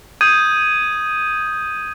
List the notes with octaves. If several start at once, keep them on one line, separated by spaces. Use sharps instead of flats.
D#6 G6 G#6 D#7